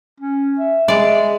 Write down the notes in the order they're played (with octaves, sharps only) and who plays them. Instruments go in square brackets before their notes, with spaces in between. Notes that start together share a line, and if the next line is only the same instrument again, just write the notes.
[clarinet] C#4
E5
[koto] G#3 D5